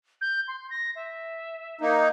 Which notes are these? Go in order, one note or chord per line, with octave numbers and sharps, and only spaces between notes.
G6
C6
A#6
E5
A#3 D#4